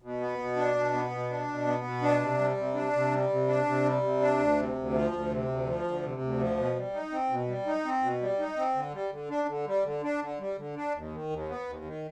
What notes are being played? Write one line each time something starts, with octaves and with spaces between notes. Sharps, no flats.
B2
B3
B2
D4
B2
B3
B2
D4
B2
B3
B2
D4
C3
G3
C3
D4
C3
G3
C3
D4
C3
G3
C3
D4
D2
C3
D2
F3
D2
C3
D2
F3
D2
C3
D2
F3
B2
G3
D#4
C4
B2
G3
D#4
C4
B2
G3
D#4
C4
D3
G3
D3
D4
D3
G3
D3
D4
D3
G3
D3
D4
D#2
D#3
D#2
B3
D#2
D#3